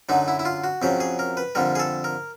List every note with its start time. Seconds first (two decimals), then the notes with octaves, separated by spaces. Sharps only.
0.09 F#2 D3 F#3 D#4
0.28 E4
0.39 E4
0.45 F4
0.64 F#4
0.82 F2 C#3 F#3 G4
1.00 G#4
1.19 A#4
1.37 B4
1.55 F2 D3 G3 A#4
1.75 G#4
1.79 A4
2.04 A#4